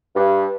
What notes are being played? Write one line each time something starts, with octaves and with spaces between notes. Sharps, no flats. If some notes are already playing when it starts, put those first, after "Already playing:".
G2